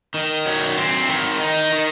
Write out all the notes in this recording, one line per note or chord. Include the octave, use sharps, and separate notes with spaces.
D#3
F#3
C4
D#3
D#4
D#3